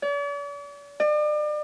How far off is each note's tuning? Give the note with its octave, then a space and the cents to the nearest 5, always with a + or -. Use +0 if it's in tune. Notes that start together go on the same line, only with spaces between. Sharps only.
D5 -45
D5 +40